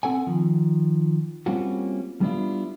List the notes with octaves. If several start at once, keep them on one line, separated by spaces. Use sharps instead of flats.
C4 A4 F#5 G#5
D#3 F3
G3 A#3 C4 C#4 F4 F#4
G3 B3 D4 E4 F4